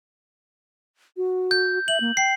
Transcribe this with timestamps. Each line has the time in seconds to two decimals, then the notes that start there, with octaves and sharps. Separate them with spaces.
1.17 F#4
1.51 G6
1.88 E5 F#7
2.01 A#3
2.17 G5 C7